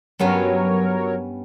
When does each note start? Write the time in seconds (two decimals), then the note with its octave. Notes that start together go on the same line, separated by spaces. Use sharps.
0.19 G2 F#3 B3 C#4 A#4 C#5